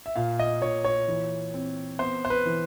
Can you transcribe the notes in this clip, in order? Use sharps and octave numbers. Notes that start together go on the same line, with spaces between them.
E5
A#2 F5
D#5
A#2 C#5
C#5
E3
C4
B3 C5
C5
B4
E3